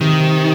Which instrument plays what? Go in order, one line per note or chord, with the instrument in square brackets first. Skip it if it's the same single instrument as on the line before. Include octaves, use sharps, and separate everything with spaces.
[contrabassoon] C3 [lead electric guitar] D#3